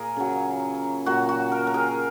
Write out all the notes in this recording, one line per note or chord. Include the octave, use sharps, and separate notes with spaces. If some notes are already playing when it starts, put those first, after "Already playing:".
Already playing: A#2 G#4 A#4
C#3 F#3
A#2 F#3 F#4
F#4
A#4
A#4
G#4